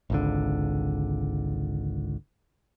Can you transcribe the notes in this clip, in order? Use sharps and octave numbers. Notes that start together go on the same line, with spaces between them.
G#1 C#2 D3